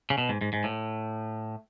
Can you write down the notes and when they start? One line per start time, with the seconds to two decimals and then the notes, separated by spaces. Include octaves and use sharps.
0.10 C#3
0.18 B2
0.29 G#2
0.41 G#2
0.53 G#2
0.64 A2